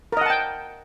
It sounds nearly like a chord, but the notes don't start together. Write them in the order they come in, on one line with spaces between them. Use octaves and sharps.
A#4 D#5 F#5 A5 G5